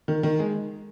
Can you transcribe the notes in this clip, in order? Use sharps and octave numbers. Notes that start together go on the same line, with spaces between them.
D#3
D#3
G#3